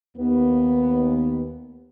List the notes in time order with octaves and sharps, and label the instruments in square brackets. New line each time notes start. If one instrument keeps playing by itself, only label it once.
[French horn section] D#2 B3